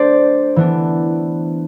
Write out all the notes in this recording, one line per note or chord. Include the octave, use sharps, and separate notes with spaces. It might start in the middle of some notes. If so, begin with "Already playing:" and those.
Already playing: A3 D4 C5 D5
E3 B3 D4